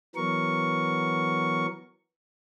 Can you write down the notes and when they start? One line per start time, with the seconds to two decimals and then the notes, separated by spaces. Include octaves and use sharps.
0.16 E3 F#3 B3 A#4 C#6